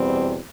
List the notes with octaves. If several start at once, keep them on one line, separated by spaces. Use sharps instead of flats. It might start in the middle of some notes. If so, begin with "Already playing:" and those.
Already playing: E2 B2 G3 C4